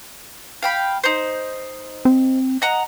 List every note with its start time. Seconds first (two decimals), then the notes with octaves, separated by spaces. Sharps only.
0.62 F5 G5 B5
1.04 D#4 C5
2.05 C4
2.62 D#5 F#5 A#5